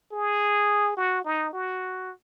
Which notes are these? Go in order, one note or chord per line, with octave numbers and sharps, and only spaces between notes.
G#4
F#4
D#4
F#4